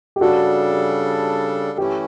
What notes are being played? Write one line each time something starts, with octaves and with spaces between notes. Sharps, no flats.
G4
C#3 G3 D4 F#4 A4
E3 A3 C#4 E4 G4